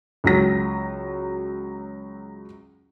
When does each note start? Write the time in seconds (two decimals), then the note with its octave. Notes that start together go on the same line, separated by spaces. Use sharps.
0.24 C#2 F#3 A#6